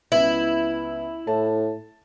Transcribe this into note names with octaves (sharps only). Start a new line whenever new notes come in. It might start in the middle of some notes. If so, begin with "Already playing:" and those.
C#2 B3 E4 E5
A2 A5